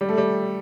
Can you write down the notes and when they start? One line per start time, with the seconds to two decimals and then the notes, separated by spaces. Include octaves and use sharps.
0.01 G3
0.09 A3
0.18 G3